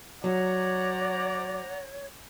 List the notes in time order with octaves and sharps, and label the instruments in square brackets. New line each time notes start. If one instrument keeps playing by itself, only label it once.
[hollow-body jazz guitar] F#3 [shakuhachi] C#5 [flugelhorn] D5 [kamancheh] F#5 A#5